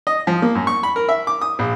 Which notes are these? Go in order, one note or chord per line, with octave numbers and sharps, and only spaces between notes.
D#5
F3
A#3
F#2
C#6
B5
A#4
E5
D6
D#6
A#1